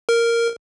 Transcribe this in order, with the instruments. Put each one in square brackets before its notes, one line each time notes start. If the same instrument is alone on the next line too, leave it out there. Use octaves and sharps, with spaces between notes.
[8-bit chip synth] A#4